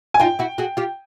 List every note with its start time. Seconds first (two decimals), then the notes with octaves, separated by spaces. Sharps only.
0.14 G#5
0.20 D#4 F4 G5
0.39 E4 F#4
0.58 F#4 G#4
0.77 F4 G4